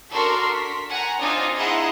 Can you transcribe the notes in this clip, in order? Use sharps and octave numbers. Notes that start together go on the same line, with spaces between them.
D4 F#4 A4 A#4 C6 C#6
B6
F#5 G#5 A#5
C4 D4 D#4 F4 D#5 G#5
E4 G#4 D#5 F#5 A#5 C6